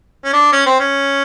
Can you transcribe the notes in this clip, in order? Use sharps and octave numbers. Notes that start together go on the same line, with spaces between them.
C#4
D4
C#4
C4
C#4